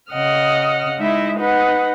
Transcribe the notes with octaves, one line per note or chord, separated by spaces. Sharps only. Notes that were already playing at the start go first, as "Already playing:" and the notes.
C#3 D#5 F#5 F6
G#3 D#4 E4 E5
D#4 B4 F#5